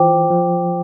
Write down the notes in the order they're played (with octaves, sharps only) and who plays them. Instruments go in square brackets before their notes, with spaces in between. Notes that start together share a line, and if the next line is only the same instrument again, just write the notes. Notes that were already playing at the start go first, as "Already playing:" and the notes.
Already playing: [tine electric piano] E3 [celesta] F4 C5 G5 D6
[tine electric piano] F3